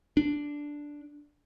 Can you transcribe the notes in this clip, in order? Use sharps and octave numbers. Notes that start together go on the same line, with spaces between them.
D4